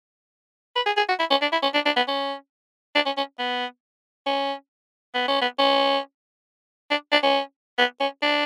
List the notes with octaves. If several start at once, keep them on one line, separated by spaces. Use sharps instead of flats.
B4
G#4
G#4
F#4
E4
C#4
D4
E4
C#4
D4
D4
B3
C#4
D4
C#4
C#4
B3
C#4
B3
C#4
B3
C#4
D4
D4
C#4
B3
C#4
D4